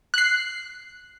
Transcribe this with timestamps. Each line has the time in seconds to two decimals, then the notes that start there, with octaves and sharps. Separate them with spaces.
0.14 F#6 C7